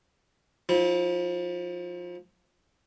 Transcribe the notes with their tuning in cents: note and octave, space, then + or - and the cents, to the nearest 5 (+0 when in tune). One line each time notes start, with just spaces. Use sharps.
F3 +20 E4 -30